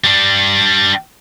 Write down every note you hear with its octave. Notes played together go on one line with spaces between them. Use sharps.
G3 D4